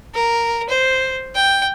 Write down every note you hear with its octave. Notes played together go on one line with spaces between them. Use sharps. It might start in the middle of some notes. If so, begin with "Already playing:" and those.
A#4
C5
G5